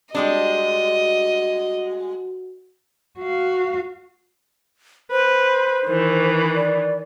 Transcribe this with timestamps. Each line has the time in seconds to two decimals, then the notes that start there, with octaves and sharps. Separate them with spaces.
0.15 G3 G#3 D4 F#4 D#5
3.19 F#4 F5
5.11 B4 C5
5.86 D#3 E3
6.55 D5